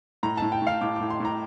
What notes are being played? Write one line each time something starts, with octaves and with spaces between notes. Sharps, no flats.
A2 A#5
A2 A5
G5
A2 F5
A2 D6
A2 D6
C6
A2 A#5